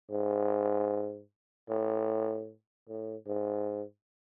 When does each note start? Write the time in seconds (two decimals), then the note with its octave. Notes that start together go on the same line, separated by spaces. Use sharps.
0.10 G#2
1.69 A2
2.88 A2
3.27 G#2